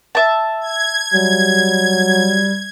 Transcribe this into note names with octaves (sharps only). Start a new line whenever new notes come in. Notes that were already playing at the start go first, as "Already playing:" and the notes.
E5 A5
G#6
F#3 G3